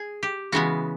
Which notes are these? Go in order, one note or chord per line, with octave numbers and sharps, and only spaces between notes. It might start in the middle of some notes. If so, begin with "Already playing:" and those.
Already playing: G#4
G4
C#3 E3 G#3 B3 F#4